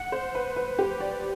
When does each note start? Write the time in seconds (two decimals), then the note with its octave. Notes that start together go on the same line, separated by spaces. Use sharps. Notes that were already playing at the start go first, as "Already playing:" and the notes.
Already playing: F#5
0.12 C5
0.35 B4
0.56 B4
0.79 G4
1.00 D5